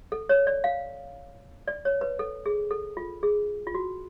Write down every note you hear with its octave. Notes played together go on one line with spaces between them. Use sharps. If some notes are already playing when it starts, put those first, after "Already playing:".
A4
C#5
D5
F5
D5
C#5
B4
A4
G#4
A4
F4
G#4
F4
F#4